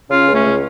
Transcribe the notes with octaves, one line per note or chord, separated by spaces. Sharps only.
C#3 C#4 F4
C#2
A3 C#4
C#3